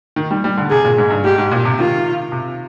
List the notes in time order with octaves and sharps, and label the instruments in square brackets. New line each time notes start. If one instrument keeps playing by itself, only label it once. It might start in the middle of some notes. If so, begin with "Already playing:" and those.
[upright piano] D#3
G3
G3
D3
[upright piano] C3 [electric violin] G#4
[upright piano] A#2
G#2
G2
[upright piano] G#2 [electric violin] G4
[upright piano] G#2
A#2
C3
[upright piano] D#3 [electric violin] F4
[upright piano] C3